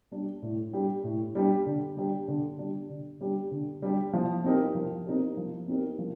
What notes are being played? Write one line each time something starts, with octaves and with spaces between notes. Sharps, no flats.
G3 D4 G4
A2
G3 D4 G4
A2
G3 D4 G4
D3
G3 D4 G4
D3
G3 D4 G4
D3
G3 D4 G4
D3
G3 D4 G4
F3
C4 D#4 G4 A#4
F3
C4 D#4 G4 A#4
F3
C4 D#4 G4 A#4
F3